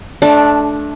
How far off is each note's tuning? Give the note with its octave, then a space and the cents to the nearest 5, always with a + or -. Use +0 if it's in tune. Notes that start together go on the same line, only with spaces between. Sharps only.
A3 -20 D4 +0